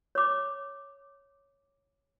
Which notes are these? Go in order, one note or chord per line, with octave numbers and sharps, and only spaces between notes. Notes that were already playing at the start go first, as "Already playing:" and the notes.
C#5 D6